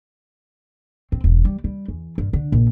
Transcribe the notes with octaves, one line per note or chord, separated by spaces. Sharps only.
C4
E1
G3
G3
E2
G2
D3
A#1